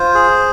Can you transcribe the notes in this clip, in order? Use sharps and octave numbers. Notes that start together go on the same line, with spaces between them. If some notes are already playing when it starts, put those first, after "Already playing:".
Already playing: F4 C5
G#4